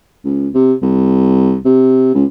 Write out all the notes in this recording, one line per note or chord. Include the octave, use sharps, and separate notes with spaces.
C#2
C3
C2
C3
C#2